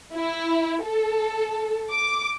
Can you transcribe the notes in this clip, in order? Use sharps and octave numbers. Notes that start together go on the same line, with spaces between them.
E4
A4
D6